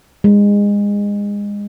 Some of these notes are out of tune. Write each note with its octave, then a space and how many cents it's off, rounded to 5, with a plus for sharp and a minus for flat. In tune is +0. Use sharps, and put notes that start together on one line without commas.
G#3 -25